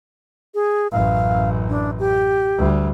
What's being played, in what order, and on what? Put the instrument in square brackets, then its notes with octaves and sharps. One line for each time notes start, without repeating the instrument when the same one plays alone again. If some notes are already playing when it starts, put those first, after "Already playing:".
[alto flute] G#4
[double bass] A1 F#2 [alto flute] F5
[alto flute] D4
G4
[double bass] D2 G3